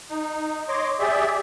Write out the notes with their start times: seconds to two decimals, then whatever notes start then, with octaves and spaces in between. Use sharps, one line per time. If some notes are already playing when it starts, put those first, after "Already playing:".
0.10 D#4
0.69 C#5 D#5 C6 D6
0.99 G4 G#4 D5 E5